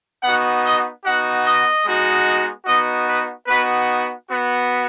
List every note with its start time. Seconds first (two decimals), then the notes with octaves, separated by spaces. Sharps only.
0.23 B3 D#4 F#4 F#5
0.64 D#5
1.04 B3 D#4 F#4 F#5
1.45 D#5
1.85 G#3 B3 D#4 F#4
2.66 B3 D#4 F#4 D#5
3.07 B4
3.46 B3 D#4 F#4 B4
4.28 B3 F#4